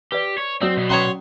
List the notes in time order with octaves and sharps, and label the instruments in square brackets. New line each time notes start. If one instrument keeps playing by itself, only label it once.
[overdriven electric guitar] G4 [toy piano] B4 D5
[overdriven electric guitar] C#5
[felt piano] F#3 F#4 D5 [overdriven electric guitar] C4 [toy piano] C#5 D#6 E6
[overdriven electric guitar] B2 B3
[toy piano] C#4 A#5 D#6 [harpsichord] C#5 F#5 C6